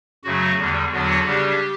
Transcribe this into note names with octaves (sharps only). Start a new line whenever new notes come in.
F#2 C#3 F#3 A3 F#4
E2 D3 G3
E2 D3 F#3 B3 D4 F#4
C#3 G3 D4 G4